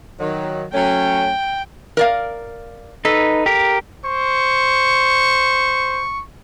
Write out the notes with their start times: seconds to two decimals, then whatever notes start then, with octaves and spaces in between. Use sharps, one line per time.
0.19 D#3 F#3
0.73 F#3 A3 C#4 G5
1.97 A#4 D5 F5
3.05 D#4 A4 B4
3.46 G4 A#4
4.06 C5 C#6